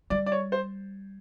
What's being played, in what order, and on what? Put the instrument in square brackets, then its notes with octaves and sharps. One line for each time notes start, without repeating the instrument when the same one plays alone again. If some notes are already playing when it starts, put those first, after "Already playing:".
[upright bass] G3 [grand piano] D5
[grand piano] D5
C#5
C5